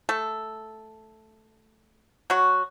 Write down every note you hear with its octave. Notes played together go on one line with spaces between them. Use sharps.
A3 A4
F#3 F#4